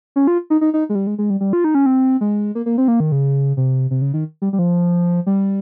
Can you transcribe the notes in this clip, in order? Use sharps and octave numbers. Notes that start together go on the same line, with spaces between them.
C#4
F4
D#4
D#4
D#4
G#3
G3
G#3
G#3
G3
G3
F4
D#4
C#4
C4
G#3
A#3
A#3
C4
A#3
D#3
C#3
C3
C3
C#3
D#3
G3
G3
F3
G3